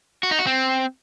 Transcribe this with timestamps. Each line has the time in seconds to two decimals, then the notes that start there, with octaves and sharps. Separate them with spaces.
0.23 F#4
0.31 D#4
0.39 F#4
0.47 C4